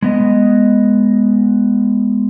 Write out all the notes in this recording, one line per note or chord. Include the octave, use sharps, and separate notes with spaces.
G#3 B3 D#5